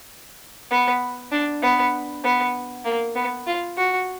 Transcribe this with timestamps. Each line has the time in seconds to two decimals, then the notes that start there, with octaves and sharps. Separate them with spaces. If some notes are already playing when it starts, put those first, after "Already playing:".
0.71 B3
1.32 D4
1.62 B3
2.24 B3
2.85 A#3
3.16 B3
3.47 F4
3.77 F#4